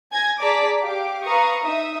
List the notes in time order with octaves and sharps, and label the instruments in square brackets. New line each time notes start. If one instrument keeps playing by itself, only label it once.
[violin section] G#5 G#6 A#6
G#4 D5 A5 A#5 D6 B6
G4 F5 D6
B4 F5 A#5 C#6 D#6
D#4 E5 D#6